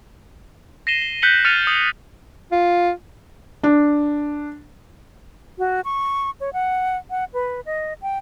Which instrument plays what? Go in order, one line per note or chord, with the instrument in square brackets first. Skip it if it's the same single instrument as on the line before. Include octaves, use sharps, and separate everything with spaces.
[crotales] A#6 C7 D#7 E7 G7
G7
F#6 G6 B6 C#7 F#7 G7
F6 A6 C#7 D#7 F7
D#6 G6 C7 F#7
[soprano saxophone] F4
[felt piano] D4
[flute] F#4
C#6
C#5
F#5
F#5
B4
D#5
G5